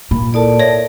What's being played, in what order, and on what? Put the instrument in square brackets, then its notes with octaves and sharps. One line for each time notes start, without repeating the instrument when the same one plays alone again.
[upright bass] A#2 [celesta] B5
[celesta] E4 A4 A#4 [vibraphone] D5 A5
[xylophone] C#5 E5 A#6